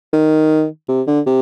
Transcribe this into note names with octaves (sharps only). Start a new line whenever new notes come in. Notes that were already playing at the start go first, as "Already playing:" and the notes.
D#3
C3
D3
C3